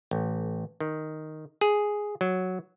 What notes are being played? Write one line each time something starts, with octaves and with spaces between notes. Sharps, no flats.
A1
D#3
G#4
F#3